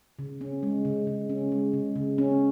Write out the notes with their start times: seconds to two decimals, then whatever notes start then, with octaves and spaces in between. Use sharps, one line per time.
0.19 C#3
0.41 C#4
0.63 G#3
0.85 C#3
1.07 C#3
1.30 C#4
1.52 G#3
1.73 C#3
1.96 C#3
2.18 C#4